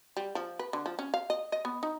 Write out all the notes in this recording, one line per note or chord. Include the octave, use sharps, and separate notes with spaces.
G3
F3
B4
D3
F3
C#4
F5
D#5
D#5
B3
D#4